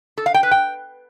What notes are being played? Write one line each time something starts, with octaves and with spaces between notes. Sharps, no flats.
A4
F5
G5
B4
G5